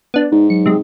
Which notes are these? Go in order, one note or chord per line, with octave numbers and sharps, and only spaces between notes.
B3 D4
G#2 D#4
F#3 C#7
C3 G#3